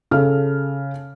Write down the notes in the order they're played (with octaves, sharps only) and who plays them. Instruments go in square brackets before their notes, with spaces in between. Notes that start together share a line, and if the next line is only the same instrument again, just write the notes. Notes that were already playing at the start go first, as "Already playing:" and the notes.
[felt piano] C#3 A4 F6